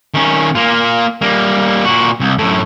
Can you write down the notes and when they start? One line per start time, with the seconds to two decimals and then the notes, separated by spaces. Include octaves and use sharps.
0.14 D#3 C#4
0.55 A#3 F4
1.22 G3 A#3
1.85 A#2 F#4
2.20 C2
2.38 F#2 A2